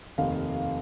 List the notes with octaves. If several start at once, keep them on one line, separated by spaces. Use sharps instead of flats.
F1 D#2 D#3 F5